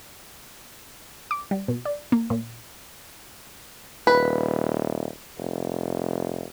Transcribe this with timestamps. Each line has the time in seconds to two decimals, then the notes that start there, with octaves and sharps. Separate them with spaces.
1.31 D6
1.51 G3
1.68 B2
1.85 D5
2.12 A#3
2.30 A#2
4.07 D#1 B4
5.38 F1